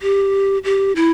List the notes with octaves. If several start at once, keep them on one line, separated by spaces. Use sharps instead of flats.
G4
G4
E4